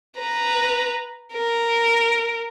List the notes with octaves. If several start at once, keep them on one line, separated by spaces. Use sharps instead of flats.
B4 A#5
A#4